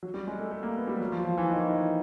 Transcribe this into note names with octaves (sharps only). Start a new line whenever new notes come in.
F#3
G3
G#3
A3
A3
A#3
B3
G3
F#3
F3
F3
E3
D#3
E3
D#3